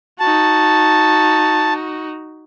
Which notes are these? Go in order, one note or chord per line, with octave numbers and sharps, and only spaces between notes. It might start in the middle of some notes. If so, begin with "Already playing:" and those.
D#4 F#4 A5